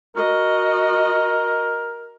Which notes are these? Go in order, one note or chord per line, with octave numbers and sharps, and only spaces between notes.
F#4 A#4 D#5